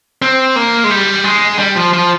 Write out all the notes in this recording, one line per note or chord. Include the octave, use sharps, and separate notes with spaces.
C4
A#3
G#3
G3
G#3
G3
F3
F3